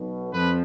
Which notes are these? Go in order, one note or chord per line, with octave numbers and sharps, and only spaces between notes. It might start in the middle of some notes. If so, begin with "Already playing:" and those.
Already playing: B1 B2
F2 F3 B4